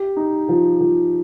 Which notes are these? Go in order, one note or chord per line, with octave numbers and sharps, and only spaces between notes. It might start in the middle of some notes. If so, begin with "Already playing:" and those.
Already playing: G4
D#4
F3
F3